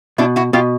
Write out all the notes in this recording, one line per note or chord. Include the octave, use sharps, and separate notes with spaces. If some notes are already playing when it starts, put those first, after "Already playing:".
B2 D4 E4
E4 F#4
B2 F4 G4